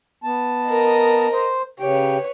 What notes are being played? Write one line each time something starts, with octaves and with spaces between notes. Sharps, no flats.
B3 A5
A#4 D#5
C5
C#3 G4 B4 C#5 G5